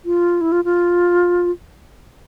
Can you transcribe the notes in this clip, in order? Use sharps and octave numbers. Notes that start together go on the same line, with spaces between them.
F4
E4
F4
F4